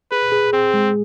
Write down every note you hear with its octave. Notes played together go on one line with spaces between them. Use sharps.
G#4 B4
G#4
C4 G#4
G#3